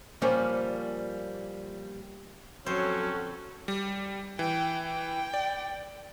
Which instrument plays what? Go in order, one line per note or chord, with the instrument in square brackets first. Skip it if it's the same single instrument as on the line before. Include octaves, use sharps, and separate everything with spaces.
[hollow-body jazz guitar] A#2 F3 G3 C#4 G4
[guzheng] F2 C5 [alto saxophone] F#3 [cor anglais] C#4 [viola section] F#4 A4
[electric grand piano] G3
[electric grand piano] E3 [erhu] G5
[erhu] G5
[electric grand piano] D5